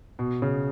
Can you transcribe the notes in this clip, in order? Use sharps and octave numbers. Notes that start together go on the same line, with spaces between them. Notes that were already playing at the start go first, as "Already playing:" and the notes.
B2
C#3